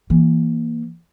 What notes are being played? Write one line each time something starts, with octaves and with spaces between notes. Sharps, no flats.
E3 A#3